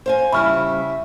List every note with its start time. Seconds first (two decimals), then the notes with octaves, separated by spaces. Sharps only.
0.06 C5 F5 G#5
0.32 C#3 G3 E4 E5 B5 C#6 F6